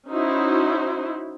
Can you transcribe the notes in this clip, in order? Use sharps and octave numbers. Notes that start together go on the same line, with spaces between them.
C#4 D#4 E4 F#4 C5